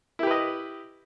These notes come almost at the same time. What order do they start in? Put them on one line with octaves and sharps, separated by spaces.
E4 G4 B4 D#5